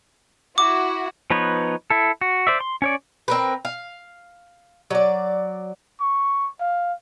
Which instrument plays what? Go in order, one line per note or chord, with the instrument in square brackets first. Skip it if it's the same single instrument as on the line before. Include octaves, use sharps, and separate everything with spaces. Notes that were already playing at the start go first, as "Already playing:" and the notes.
[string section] E4 F#4 [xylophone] D6
[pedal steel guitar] F3 B3 D#4 B4 C#5
E4 A4
F#4
C5 D5 E5
C6
C#4 C#5 D5
[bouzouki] C4 A#4 B4
F5
F#3 D5
[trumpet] C#6
F5